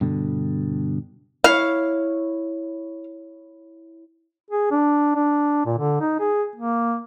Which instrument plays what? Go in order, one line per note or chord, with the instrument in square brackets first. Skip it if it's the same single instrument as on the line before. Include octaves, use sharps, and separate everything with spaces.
[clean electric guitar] G2 B2 D3
[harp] E4 C#5 [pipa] F5
[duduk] G#4
D4
D4
A#2
D3
D#4
G#4
A#3